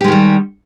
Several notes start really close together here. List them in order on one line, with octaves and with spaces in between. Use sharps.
G4 G#3 D#3 G3